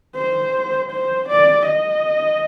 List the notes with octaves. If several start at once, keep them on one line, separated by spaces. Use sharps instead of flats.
C5
C5
D5
D#5